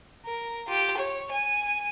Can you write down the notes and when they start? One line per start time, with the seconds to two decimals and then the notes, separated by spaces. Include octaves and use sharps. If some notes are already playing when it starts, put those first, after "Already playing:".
0.25 A#4
0.67 F4 G4
0.97 C#5
1.31 G#5